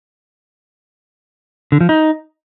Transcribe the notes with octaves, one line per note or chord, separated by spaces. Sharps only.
D3
F3
D#4